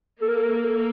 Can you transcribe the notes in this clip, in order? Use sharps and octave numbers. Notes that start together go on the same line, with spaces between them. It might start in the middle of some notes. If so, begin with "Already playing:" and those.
A#3 A4
A#4
A4
A#4
A4
A#4
A4